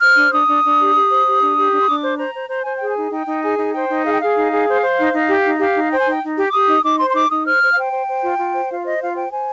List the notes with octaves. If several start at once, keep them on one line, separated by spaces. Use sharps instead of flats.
C5 F6
D4
D4 D#6
D4
D4
G4
G4
C5
G4
D4
G4
D4
C6
D4 D6
C5
C5 A#5
C5
C5 A#5
C5 G#5
G#4 G5
G#5
D#4
D#4 G5
D#4
G#4 G#5
D#4
C5 G5
D#4
G#4 F5
G5
G#4 F5
D#4
G#4
C5
C5
D#4
D#4
G4
D#4
G4 F5
D#4
C5 G5
G#5
D#4 G5
D#4
G4
D6
G4 D#6
D#4
D#4 D6
C5 C6
C6
D#4 D6
D#4 D#6
C5 F6
C5
F5
C5 G5
C5
C5
F4
F4
C5
F4 F5
C5 D#5
F4 F5
C5 G5
C5 G#5